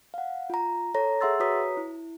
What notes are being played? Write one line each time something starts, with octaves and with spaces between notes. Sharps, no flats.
F5 F#5
F4 A#5
A4 C#5 A#5 A#6
G#4 E5 F#5 C6 E6 A6
F#4 B4 C#5 A#5 D#6 B6
E4